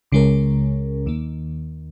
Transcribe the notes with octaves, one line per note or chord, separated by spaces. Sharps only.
C#2 C#3 G#3 C#4 A#4
D#2 D#3 A#3